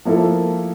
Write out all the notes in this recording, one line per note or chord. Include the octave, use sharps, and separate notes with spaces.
F3 A#3 E4 A4